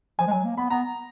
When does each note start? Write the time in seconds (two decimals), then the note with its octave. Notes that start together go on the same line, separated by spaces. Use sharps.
0.19 F3 G#5
0.27 G#3
0.31 F#3 G#5
0.45 A#3
0.57 B3 B5
0.70 B3 A#5